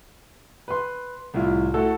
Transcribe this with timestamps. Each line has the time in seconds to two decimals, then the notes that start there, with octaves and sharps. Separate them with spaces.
0.68 B4 C6
1.34 C2 A2 E4 F4
1.74 A3 E4 F#4 A4